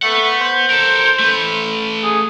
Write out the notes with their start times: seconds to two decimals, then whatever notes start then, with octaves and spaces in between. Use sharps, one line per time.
0.02 A3 B4 F#5
0.41 C5
0.70 A4 A#4
1.19 A3 B4
2.03 G#4